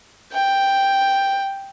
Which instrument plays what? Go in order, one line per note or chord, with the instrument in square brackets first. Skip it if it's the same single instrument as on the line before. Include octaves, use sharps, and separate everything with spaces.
[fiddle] G5